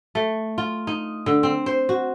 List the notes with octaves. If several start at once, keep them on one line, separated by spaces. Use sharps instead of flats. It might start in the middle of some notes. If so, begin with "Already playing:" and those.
A3
F4
D#4
D3
C4
C5
F#4